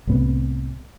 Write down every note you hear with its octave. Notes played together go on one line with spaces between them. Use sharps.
C2 A2 B3 C4